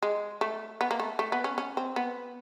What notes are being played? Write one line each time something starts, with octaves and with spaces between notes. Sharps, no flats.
G#3
A3
B3
A#3
A3
A3
B3
C#4
C#4
C4
B3